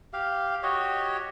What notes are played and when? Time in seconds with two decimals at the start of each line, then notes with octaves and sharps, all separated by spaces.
0.13 G4 F5
0.63 F#4 G4 C#5 D#5